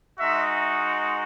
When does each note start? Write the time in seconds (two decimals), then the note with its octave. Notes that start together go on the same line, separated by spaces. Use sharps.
0.20 G#3 D#4 F#4 E5